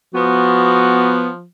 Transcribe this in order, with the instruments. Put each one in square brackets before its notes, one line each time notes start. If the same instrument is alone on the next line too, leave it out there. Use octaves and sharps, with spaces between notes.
[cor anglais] F3 [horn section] B3 [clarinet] F#4